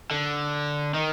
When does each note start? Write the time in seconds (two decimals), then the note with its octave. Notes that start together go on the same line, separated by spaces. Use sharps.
0.11 D3
0.94 D#3